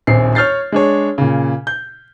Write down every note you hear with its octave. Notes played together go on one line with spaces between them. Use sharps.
D#1 A#1 C4 C7
C#5 F6 G6 A6 C7
G#3 D4 C#5
A#2 C#3
G6